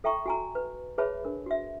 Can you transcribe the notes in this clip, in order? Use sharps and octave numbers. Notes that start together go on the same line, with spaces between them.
A4 E5 G5 A#5 C#6
F#4 G#5 A#5
B4
G#4 B4 C#5 E5 A5 B5
D4 A#4
F#4 E5